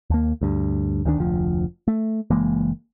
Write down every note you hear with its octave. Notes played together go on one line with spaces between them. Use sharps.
D#2 A#3
D2 G2
D2 D#3 E3 D4
F1 D2 F3
A3
F#1 E3 G#3 A#3